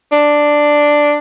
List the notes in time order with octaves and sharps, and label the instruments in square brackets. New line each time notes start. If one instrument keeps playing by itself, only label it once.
[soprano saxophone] D4